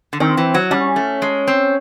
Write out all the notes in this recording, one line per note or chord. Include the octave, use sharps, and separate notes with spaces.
D3
D#3 C4
E3
F#3
G3 C#4
A3
G#3
C4